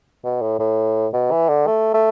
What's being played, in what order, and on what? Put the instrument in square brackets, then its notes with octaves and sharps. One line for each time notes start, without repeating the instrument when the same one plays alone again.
[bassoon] B2
A2
A2
B2
E3
D3
A3
A3